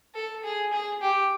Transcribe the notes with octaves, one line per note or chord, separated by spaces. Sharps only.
A4
G#4
G#4
G4